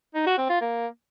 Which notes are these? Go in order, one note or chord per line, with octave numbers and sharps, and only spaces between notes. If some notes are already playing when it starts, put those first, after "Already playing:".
D#4
F#4
C4
F4
A#3